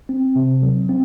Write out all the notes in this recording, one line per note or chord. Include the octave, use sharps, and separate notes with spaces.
C4
C3
F#3
C4